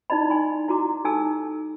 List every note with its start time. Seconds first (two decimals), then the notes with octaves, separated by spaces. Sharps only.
0.10 D#4 E4 D5 D#5 B5
0.30 G#5 B5 C6
0.68 E4 F#4 A#5 D6
1.04 D#4 G4 A4 G#5 E6